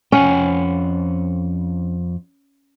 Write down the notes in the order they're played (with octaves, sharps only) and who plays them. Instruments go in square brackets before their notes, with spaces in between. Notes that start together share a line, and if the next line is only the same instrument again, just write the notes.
[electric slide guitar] F2 F#5 G5 [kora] C#4